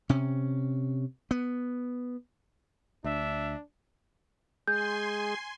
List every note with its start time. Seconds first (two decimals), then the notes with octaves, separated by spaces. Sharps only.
0.09 C3 C#4
1.31 B3
3.04 D2 D4 E5
4.68 G#3 G#4 G#5 C6 G6